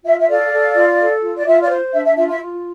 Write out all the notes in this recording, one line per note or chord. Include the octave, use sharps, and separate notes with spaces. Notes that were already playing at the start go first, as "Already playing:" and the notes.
F4 E5
E5
A4 D5 F5
A4
F4
A4
F4
D5
F4 E5
D5 F5
C5
D4 E5
E5
F4 E5
E5
F4